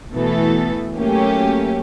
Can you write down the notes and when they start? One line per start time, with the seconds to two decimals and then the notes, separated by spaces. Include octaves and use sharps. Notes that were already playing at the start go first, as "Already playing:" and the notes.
0.12 B2 E3 A3 B3 A4
0.98 F#3 A3 A#3 C#4 G4